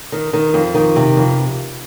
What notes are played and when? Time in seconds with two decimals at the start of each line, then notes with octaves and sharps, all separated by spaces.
0.12 D#3
0.33 D#3
0.54 F2
0.75 D#3
0.96 C3
1.17 F2